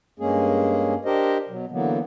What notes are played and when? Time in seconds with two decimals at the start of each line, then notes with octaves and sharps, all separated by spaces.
0.19 G2 G#3 A#3 C#4 G#4
1.05 D4 G4 A#4 C5 D#5
1.49 B2 F#3
1.71 D3 E3 F#3 A#3 B3